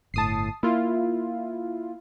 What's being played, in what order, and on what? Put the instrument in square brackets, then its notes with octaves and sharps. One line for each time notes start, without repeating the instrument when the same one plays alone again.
[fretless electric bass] G1 A2 [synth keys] A5 D#6 C7
[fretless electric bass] A#3 [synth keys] E4 F4